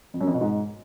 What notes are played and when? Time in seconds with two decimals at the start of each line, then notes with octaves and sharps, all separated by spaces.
0.14 F2
0.21 F#2
0.27 F2
0.34 B2
0.41 G#2